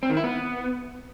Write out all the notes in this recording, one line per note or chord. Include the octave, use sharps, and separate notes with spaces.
C4
D#3
E4
B3